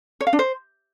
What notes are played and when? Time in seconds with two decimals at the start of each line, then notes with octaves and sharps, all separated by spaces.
0.21 C#5
0.27 F5
0.33 D4
0.39 C5